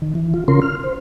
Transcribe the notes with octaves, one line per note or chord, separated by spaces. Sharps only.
D#3
E3
F4
C#3 C#4 F4 A#4 C6
F6
C5